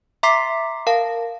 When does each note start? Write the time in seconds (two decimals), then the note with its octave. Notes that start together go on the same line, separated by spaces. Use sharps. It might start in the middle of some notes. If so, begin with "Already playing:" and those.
0.23 E5 A#5 C6 D6 B6 C7
0.87 A#4 F5 A5